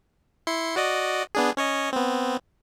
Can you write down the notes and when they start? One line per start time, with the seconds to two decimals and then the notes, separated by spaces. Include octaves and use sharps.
0.47 E4 C6 C#7
0.76 F#4 D5 D#5
1.35 B3 D4 G#4
1.57 C#4 C#5 D#5
1.93 B3 C4